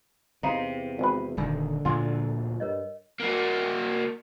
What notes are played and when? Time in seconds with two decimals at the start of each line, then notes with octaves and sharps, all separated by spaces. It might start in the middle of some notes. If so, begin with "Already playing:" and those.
0.43 E2 C3 D#4 F5 C6
0.99 G#1 B4
1.37 D#1 D3 D#3
1.85 D2 A#2 F3 F4 G#5
2.60 G2 A#4 C#5 D#5
3.20 A#3 F#4